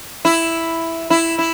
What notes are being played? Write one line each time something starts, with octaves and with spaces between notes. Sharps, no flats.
E4
E4
E4